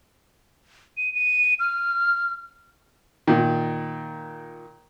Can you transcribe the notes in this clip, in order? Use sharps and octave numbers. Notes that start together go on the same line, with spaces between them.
D#7
D#7
F6
A#2 D#3